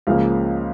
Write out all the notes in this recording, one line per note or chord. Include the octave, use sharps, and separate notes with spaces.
C#2 C#3 F3 A#3 F5